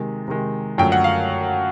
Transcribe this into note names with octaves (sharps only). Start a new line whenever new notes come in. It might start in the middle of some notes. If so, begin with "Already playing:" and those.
Already playing: C3 D#3 G#3
C3 D#3 G#3
F#2 D3 F3 A3 G5
F#5
F5